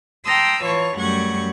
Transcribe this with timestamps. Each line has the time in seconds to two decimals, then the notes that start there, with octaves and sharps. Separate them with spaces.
0.25 G5 A5 A#5 C6 D#6 E6
0.64 E3 F4 C#5 A5 C#6
0.99 F#2 G3 A3 F#5 C#6 G#6